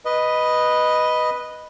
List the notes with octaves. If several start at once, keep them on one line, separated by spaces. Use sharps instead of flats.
B4 D#5